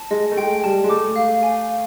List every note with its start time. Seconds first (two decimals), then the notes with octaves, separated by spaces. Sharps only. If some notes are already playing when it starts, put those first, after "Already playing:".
Already playing: A5
0.11 G#3 D#5
0.32 A3
0.37 G#3 G5
0.64 G3 A5
0.84 G#3
0.89 A3 D6
1.16 F5
1.43 G#5
1.69 F5